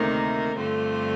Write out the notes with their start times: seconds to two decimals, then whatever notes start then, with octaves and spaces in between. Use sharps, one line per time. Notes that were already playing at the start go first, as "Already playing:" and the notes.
Already playing: D2 C3 D#3 A#3 D#4
0.56 G2 D3 A3 C4 F4